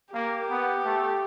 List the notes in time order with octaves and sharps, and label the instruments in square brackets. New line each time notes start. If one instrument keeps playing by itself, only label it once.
[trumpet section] A#3 [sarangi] G4
[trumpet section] B3
A3